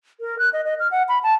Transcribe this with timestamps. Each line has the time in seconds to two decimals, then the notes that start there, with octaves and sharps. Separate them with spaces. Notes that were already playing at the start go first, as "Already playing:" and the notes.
0.20 A#4
0.39 F#6
0.53 D#5
0.65 D#5
0.80 F6
0.91 F#5
1.09 B5
1.23 A5